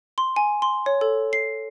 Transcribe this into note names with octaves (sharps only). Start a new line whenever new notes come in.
C6
G#5
C6
C#5
A4
C7